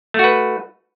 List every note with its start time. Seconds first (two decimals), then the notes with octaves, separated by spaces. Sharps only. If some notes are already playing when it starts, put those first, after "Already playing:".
0.14 A3
0.19 F#4
0.24 B4